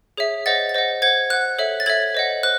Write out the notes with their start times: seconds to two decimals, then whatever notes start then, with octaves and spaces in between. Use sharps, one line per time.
0.17 G#4 C#5 E5
0.46 C5 D#5 F#5 A6
0.69 A6
0.74 C5 D#5 F#5
1.02 C5 F#5 G#6
1.30 C5 F#5 F#6
1.59 A4 C#5 E5
1.80 A6
1.86 A4 C#5 E5 G#6
2.15 C5 D#5 F#5
2.43 C5 F#6